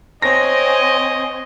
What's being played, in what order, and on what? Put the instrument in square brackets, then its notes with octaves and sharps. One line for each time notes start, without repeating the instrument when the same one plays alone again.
[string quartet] C4 [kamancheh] C#5 G#5 [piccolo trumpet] D#5 [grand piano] A#6